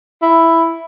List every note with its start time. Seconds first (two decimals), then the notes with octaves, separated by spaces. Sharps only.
0.22 E4